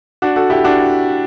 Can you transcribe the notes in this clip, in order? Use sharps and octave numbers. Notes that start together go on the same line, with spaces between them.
D4 F#4
F#4 A4
E4 G4
D4 F#4